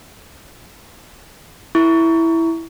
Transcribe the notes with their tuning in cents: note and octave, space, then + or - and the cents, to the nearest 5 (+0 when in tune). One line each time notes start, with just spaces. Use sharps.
E4 -5 C#6 +25